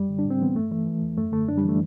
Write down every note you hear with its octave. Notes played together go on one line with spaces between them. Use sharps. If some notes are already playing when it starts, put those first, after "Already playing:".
Already playing: F#2 G3
D3
D4
A2
C4
E3 B3
G2 A3
E3 A3
E3
E2
F#2 A3
D3 A3
F#2 D4
G3
E3
A3